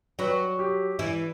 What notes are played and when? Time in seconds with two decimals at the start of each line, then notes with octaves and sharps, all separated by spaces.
0.19 F#3 F#4 B4
0.59 G4
0.99 E3 E4